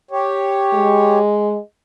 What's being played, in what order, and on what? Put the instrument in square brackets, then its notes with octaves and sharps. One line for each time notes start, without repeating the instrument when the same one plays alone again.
[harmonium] G4 C#5
[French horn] G#3